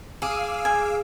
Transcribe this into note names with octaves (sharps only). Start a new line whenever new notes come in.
G#4 F5 D6 E6
G#5